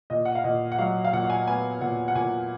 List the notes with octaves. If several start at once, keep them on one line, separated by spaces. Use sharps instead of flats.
A#2 D#5
F#5
F5
A#2 D#5
F#5
F#3 F5
F5
A#2 F#5
F#5
G#5
B3 G#5
A#2 F#5
F#5
A#2 G#5